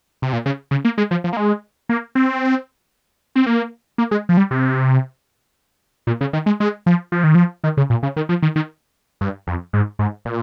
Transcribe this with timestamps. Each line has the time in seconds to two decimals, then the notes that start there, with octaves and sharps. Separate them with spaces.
0.22 C3
0.33 A#2
0.46 C#3
0.71 C#3
0.85 A#3
0.98 G#3
1.11 F3
1.24 F3
1.33 A#3
1.37 G#3
1.89 A#3
2.15 C4
3.36 C4
3.46 A#3
3.98 A#3
4.11 G#3
4.29 F3
4.37 G3
4.51 C3
6.07 A#2
6.21 C#3
6.33 D#3
6.46 G#3
6.60 G#3
6.86 F3
7.12 F3
7.24 D#3
7.35 F3
7.64 D#3
7.77 C#3
7.90 A#2
8.03 C#3
8.16 D#3
8.29 F3
8.42 D#3
8.56 D#3
9.21 G2
9.47 F2
9.73 G#2
9.99 G#2
10.25 A#2